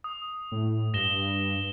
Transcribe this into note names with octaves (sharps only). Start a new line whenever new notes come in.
D#6
A2
G2 A#6 E7 G7